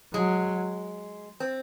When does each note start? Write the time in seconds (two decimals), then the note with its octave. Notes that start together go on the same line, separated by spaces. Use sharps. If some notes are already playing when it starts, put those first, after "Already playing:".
0.14 F#3 G#3
1.40 C4